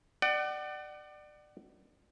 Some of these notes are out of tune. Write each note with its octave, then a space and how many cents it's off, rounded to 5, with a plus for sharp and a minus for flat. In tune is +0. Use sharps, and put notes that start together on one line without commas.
D5 +30 F#5 +35